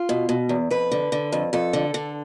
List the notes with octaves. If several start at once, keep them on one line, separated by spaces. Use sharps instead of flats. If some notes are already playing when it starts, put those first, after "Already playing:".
Already playing: F4
B2
B2
E2
F2 B4
D3
D3
F2
F2 A4
D3
D3